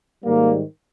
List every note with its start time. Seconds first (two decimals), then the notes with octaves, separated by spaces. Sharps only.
0.25 G#2 D#3 G3 A#3